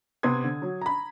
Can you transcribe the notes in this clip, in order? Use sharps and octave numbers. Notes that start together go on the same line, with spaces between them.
C3 B3 C6 D#6 G#6
D3
F#3
A#5 B5